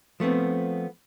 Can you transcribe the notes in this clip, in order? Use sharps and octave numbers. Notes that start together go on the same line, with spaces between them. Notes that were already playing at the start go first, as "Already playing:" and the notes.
F3 A3 B3 C4